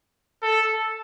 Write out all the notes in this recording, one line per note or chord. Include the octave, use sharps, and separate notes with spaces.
A4